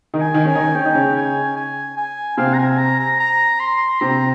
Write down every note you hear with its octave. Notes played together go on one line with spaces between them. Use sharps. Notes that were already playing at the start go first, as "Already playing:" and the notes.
D#3 D#4
G#5
D#3 D#4
C#4 G#5
D#3 D#4
C#4 G5
D#4
C#3 C#4
G#5
G#5
G#5
C3 C4 F5
A#5
G#5
A#5
A#5
A#5
C6
C3 C4 A#5